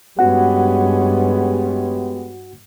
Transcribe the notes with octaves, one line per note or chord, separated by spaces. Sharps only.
G2 G#3 B3 C#4 F#4 G4 F#5